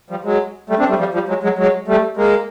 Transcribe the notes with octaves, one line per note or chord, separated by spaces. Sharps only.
F3 G3
F#3 G#3
G3 A3
C4 D4
G3 A3
F3 G3
F3 G3
F#3 G#3
F#3 G#3
F#3 G#3
G3 A3
G#3 A#3